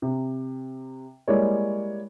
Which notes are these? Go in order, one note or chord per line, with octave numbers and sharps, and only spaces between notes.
C3
G3 G#3 A#3 E4 C#5 D5